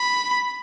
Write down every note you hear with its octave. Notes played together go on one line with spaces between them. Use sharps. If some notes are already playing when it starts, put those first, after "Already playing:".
Already playing: B5